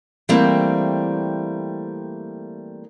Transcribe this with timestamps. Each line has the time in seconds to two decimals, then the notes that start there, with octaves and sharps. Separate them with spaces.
0.29 E3 G3 A3 A#3 C4